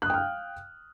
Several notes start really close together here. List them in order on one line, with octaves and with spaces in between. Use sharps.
F#6 D#6 G5 F6 F5